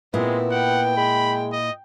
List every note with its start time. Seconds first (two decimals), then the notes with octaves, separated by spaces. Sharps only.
0.14 A#2 G#3 B3 C4 E4
0.51 F#5 G5
0.97 G#3 B5
1.52 D#5